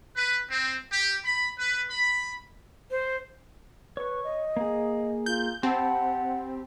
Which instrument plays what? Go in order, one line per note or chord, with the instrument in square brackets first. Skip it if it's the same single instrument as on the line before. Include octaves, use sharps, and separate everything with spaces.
[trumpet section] B4
C4
G4
B5
B4
B5
[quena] C5
[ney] B4 [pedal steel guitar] C#5 C#6
[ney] D#5
[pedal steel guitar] A#3 G#4
[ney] F4 [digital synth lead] G6
[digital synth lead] C4 [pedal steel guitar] G4 A5 B5 [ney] F#5